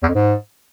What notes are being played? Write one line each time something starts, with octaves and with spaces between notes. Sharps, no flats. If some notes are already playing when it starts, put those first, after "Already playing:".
E2
F2
G#2